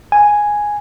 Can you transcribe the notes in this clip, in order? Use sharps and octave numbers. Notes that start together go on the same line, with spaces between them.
G#5